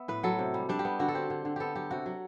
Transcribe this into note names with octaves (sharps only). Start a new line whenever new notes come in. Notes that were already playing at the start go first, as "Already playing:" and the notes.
Already playing: B3 E5
A2 B4
F#3 A4
C3
G3
G3 D4
G4
B3
D3 F#4
A4
C4 G4
D3
D3
B3 G4 A4
F#3 G4
C3 F#4
F#3